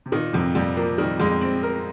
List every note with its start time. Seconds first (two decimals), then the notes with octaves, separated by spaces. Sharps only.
0.06 C3
0.12 A#2 D#3
0.33 F2 C3
0.55 F2 G3
0.77 F3 A#3
0.98 D#3 G3
1.20 F2 G#3
1.41 C4
1.63 A#4